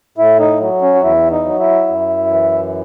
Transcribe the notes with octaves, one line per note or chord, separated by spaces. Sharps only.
A2 E4
D#4
F#3
C#4
F#4
E2 E4
D#4
F#3
E4
F#2
E3